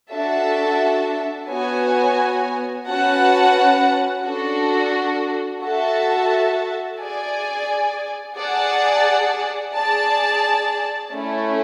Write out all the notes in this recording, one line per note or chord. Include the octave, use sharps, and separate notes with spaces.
D4 F#4 A4 E5 A5
B3 F#4 C#5 G#5
C#4 F#4 B4 F#5 A5
D4 F#4 A4
F#4 A4 E5 A5
G#4 D5 G#5
G#4 D5 F#5 A5
G#4 D5 A5
A3 C#4 E4